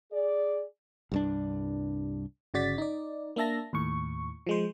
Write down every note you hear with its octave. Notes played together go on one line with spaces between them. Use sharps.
G#4 D5
C2 G2 D4
G1 C#3 F#4 D5 A6 B6
D#4 D5
A#3 D4 E5 A5 A#6
D#2 A2 C#6
F3 G#3 C5